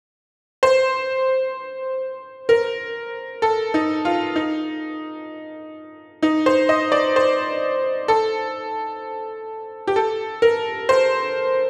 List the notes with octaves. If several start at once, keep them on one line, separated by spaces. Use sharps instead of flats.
C5
A#4
A4
D#4
F4
D#4
D#4
C5
D#5
D5
C5
A4
G4
A4
A#4
C5